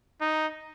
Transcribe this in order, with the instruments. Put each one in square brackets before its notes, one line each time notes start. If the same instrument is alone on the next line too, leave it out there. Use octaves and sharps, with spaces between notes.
[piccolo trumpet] D#4